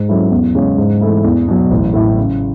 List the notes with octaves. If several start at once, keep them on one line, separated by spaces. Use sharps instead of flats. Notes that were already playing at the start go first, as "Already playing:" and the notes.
Already playing: G#2
F#3 C#4 E4 A4
E2
C#3 G#3 C#4
G#2
E3 A3 E4
E2
B2 F#3
A1
A2 E3 A3 E4
C#3